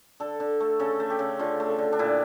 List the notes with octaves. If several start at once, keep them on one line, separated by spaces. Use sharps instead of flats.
D3 A4
D3
A3
C#3 A4
A3
G4
C#3
D3 F4
A3
D3
D4
A#2 E4